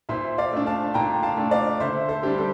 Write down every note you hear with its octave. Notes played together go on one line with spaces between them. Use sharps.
A#2 C5 E5
D5 F5
A3 D4
F5 A5
A#2 G5 A#5
F5 A5
A3 D4
D5 F5
D3 C5 E5
A4 C5
G3 D4 G4
A4 C5